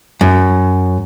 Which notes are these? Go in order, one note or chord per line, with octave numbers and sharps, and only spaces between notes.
F#2